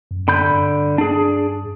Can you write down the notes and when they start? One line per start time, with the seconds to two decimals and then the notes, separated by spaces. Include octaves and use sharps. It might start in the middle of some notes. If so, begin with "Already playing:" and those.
0.11 F#2
0.28 D3 B5 G6
0.50 G2
0.98 D4 G#4